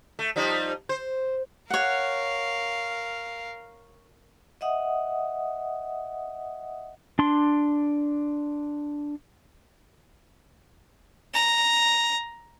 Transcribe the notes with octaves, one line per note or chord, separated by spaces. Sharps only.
A3
F3 G3 D#4
C5
A#4 C#5 F5 F#5
D#5 E5 F#5 D#6
D4 C6
A#5